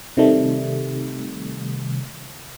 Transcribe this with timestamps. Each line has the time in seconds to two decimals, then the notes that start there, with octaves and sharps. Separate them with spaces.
0.17 C3 D#3 G3 A3